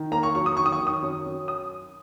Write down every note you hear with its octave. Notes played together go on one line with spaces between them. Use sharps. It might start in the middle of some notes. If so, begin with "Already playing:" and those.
Already playing: D#3
A#3 A#5
C#6
F#3 C#6
D#6
D#3 C#6
D#6
C#6
D#3
D#6
F#2
F#2
D#6